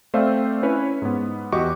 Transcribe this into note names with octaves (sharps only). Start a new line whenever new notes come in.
A3 C4 C5 D5 E5 F5
C#4 E4 B4 C#5
G#2 B3
E2 F#4 G4 D#5 C#6 D6